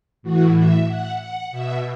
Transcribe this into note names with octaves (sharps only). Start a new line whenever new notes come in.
A2 E3 F#4
E5
F#5
F#5
B2 E5